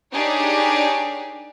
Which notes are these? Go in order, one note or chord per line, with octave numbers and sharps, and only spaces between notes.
D4 D#4 G4 G#4 A#4 C#5